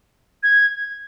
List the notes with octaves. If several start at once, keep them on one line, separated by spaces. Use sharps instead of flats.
G#6